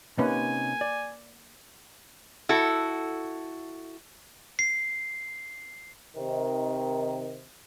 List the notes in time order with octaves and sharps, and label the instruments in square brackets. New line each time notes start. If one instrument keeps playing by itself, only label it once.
[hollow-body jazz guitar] C3 C#4 D#4 [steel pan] A#3 B4 [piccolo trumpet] G#5
[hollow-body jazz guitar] D5
[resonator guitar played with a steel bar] E4 F#4 A4
[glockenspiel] C7
[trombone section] C3 D#3